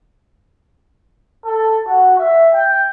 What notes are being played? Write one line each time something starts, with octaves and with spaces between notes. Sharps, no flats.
A4
F#4
E5
G5